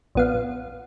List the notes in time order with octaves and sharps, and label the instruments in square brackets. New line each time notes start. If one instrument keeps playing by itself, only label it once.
[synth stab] A#1 B3 F5